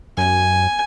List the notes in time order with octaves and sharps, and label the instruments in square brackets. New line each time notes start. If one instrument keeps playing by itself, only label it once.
[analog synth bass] F#2 [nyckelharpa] G#5